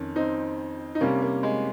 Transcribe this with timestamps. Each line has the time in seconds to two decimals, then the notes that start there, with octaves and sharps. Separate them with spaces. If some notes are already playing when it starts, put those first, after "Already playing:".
Already playing: F2 D#3 C#4
0.16 C4 D#4
0.95 D#4
1.01 C3 G3 A#3 C#4
1.22 A#3
1.43 G#3